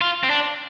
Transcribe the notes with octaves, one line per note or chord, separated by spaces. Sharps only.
F4
C4
D4